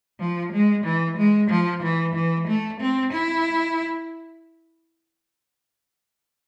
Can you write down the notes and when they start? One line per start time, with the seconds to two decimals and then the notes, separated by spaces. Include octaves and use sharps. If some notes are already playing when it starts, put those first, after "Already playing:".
0.20 F3
0.52 G#3
0.84 E3
1.17 G#3
1.50 F3
1.83 E3
2.14 E3
2.48 A3
2.80 C4
3.13 E4